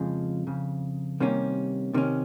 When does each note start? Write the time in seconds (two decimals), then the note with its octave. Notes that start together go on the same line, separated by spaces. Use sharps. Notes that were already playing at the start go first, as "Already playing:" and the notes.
Already playing: F2 C#3 F3 G#3
0.47 F2 C#3
1.20 C3 D#3 G3 A#3 C#4
1.94 C3 D#3 C#4